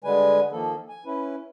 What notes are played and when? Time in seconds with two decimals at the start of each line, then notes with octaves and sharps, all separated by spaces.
0.04 D3 G3 G#3 B4 G#5
0.52 D#3 F3 A#3 A4
0.89 G#5
1.05 C#4 E4 B4